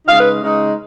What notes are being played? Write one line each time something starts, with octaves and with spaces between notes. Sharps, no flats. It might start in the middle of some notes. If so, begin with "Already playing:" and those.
C#3 G#3 D#4 F5
B4
C#3 G#3 D#4